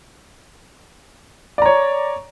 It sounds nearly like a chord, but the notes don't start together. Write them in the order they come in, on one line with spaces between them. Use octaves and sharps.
D5 A#5 C#5